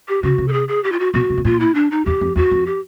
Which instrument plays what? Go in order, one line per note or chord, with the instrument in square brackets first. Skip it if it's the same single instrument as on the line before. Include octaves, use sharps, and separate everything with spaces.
[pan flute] G4
[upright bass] C#3 [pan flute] F#4
[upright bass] C3
[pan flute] A4
G#4
G#4
G4
F4
F#4
[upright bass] B2 [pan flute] F#4
[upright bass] C3
B2
[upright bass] A#2 [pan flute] F4
[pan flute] E4
D4
D#4
[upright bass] E2 [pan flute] G4
[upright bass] F2
[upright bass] E2 [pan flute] F#4
[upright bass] F2
[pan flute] G4